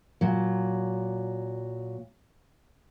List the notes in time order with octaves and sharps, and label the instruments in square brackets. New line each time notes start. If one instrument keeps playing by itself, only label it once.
[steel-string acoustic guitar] A#2 F#3